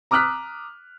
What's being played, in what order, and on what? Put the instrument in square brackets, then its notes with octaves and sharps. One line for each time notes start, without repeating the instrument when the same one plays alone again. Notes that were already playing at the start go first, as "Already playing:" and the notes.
[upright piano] A#5 D6 D#6 F6 F#6 B6